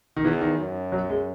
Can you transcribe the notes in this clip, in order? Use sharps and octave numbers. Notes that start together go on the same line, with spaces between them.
D#3
E2 E3
D#3
F#2
F#3
G#3